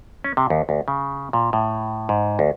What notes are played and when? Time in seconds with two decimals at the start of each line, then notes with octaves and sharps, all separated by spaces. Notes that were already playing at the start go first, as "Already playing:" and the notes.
0.24 C#4
0.37 C3
0.50 D#2
0.69 D2
0.88 C#3
1.33 A#2
1.53 A2
2.09 G#2
2.39 D2